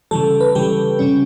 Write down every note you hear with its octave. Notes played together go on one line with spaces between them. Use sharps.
C#3 E3 G3 A4
B4
C#3 E3 G3 G4
C#3 G3 C#4